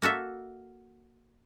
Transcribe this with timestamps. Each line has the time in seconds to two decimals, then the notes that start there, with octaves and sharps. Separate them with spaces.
0.02 A#3 F#4 A4 E5